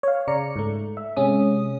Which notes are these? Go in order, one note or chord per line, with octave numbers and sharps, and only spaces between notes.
C#5 F5
C#3 D5 A#5 C#7
G#2 A3
E5
C3 G#3 C#4 D#6